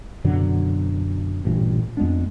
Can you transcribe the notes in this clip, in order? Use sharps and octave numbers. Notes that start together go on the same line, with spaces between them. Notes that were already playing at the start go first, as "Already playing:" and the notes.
F#2 B2 D3 F#3
A1 G2 A#2
F2 G#3 B3 D4